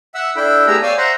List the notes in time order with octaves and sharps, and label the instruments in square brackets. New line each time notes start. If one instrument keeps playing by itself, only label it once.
[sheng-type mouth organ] E5 F#5 E6
D4 E4 A4 G5 B5
A3 B3 G4 G#4 A#5 E6
C#5 D5 F5 G5 G#5 E6
C5 E5 F#5 A#5 C6